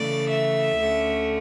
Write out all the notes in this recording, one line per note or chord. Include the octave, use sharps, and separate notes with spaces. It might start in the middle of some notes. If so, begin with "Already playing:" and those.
Already playing: C#3 E3 A3 D5
E5
D2 D3 A3 C#4